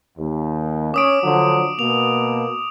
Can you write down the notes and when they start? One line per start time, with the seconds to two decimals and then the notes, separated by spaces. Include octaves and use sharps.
0.18 D#2
0.94 C#4 D6 D#6 D7
1.23 D3 F3 F#3
1.79 B2 A#3 F7